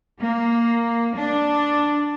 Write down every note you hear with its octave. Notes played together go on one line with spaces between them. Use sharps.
A#3
D4